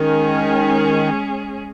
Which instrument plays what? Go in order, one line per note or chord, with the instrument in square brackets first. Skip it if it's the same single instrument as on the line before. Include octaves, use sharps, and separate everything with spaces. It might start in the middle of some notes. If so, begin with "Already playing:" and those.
Already playing: [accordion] D#3 [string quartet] G#3 C#4 G#4